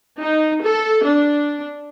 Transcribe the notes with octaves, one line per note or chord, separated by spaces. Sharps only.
D#4
A4
D4